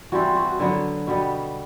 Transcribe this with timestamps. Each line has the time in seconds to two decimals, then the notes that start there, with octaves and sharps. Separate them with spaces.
0.12 E3 G3 C4 F#4
0.36 F#4
0.60 D3 F#3 B3
1.07 B2 G3 B3